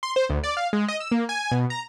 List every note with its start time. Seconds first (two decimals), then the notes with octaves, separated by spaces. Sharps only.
0.03 C6
0.16 C5
0.29 D2
0.44 D5
0.57 F5
0.73 G#3
0.88 D#5
1.00 E6
1.12 A#3
1.29 G#5
1.51 B2
1.70 A#5